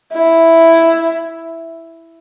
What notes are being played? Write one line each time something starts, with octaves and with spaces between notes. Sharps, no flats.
E4